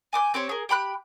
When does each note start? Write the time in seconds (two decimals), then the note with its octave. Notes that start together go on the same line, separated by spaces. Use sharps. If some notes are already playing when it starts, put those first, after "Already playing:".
0.13 G#5 D6 D#6 G6
0.34 C4 G4 C5 C#5
0.49 G#4 A#4
0.69 G4 G5 B5 F#6